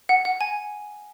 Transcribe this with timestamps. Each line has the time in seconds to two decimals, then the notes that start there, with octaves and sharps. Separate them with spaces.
0.09 F#5
0.25 F#5
0.41 G#5